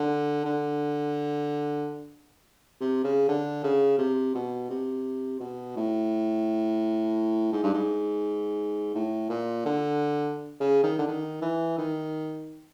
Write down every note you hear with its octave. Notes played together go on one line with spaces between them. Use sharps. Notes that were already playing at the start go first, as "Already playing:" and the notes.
Already playing: D3
D3
C3
C#3
D3
C#3
C3
B2
C3
B2
A2
G#2
G2
G#2
A2
A#2
D3
C#3
D#3
D3
D#3
E3
D#3